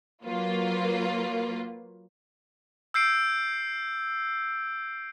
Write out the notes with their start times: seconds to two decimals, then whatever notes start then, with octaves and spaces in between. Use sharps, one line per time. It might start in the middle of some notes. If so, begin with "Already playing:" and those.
0.24 F#3 A#3 F4 B4
2.94 E6 G6 C7 D7